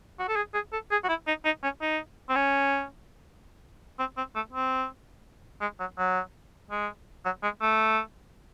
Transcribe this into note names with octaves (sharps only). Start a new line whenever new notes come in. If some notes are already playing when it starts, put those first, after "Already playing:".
F#4
A4
G#4
G#4
A4
G#4
F#4
E4
D#4
D#4
C#4
D#4
C4
C#4
C4
C4
A3
C4
G#3
F#3
F#3
G#3
F#3
G#3
A3